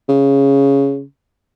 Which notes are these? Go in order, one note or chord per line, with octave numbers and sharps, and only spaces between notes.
C#3